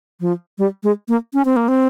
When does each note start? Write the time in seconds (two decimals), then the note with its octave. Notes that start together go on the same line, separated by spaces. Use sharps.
0.20 F3
0.58 G3
0.83 G#3
1.08 A#3
1.34 C#4
1.45 C4
1.56 A#3
1.68 C4